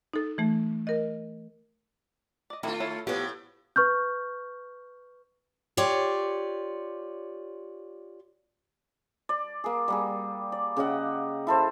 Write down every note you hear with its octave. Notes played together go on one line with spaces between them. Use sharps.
D#4 A4
E3 A3
A#4 D#5
D5 D#5
D#3 A3 C4 E4 F4
E4 A4 C#5
A2 F3 B3 G4
B4 C#6 F6 G6
F4 G4 C#5 D5
D5
A#3 G#4
G3 A#3 G#4
D5
C#3 G4 D#5 F#5
E4 A4 C5